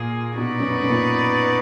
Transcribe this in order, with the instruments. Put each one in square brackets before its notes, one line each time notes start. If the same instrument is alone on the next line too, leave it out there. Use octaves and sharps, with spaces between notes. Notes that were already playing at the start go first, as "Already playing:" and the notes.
Already playing: [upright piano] A#2 [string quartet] A#3 F4 G#4
[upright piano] B2 [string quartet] B3 D#4 F#4 B4 D5
[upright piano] F#2
F#2
A#2